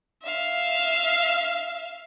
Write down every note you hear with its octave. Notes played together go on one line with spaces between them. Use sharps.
E5 F5